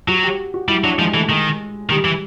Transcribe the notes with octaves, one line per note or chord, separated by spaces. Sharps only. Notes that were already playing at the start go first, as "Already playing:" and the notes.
F#3 F#4
G4
F#4
G3 E4
F#3 D4
F3 G#3
E3 A3
D#3 G#3
D#3 G3
E3